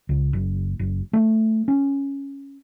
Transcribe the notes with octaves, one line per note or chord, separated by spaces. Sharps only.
C#2
F#1
F#1
A3
C#4